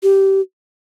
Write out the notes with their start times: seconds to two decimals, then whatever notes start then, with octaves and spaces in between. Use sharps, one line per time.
0.03 G4